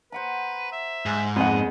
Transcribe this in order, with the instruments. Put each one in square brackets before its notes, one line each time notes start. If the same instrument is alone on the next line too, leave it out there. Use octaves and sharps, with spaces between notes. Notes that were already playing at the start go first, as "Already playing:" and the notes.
[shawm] B4 [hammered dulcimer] C5 F#5 A#5
[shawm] E5
[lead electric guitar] G#2 [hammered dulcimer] G#4
[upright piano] F2 F#5 [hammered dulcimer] A#2 G#3 B3 [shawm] D#5